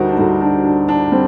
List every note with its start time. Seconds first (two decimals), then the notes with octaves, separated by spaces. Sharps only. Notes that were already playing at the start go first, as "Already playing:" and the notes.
Already playing: D2 D3 G3 D#4 F#4 A#4 C5
0.09 D4
0.18 D2 D3 G3 D#4
0.41 D4
0.64 D4
0.88 D4
1.12 G3 C4